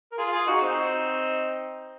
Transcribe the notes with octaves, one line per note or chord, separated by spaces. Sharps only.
A#4
F4 G#4
F4 G#4
D#4 F#4
C4 D#4